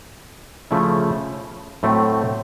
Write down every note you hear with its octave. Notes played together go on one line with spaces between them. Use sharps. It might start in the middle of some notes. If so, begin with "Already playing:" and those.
C#3 F3 A3 C#4 E4
A2 F#3 A3 C4